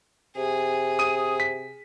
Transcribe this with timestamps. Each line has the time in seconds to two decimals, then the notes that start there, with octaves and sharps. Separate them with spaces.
0.36 C3 G#4
0.99 D#6 D#7
1.40 B6